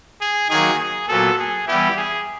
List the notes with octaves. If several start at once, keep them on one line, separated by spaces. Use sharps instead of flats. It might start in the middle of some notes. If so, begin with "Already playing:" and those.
G#4
D#3 F#3 A#3 G#4
G#4
A#2 F#3 B3 A4
G#4
E3 G3 B3 E4 G4
G#4